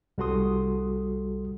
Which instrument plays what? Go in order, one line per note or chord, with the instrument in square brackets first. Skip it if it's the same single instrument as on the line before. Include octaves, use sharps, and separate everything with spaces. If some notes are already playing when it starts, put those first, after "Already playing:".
[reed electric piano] C2 G3 F#4 A4 C6 D#6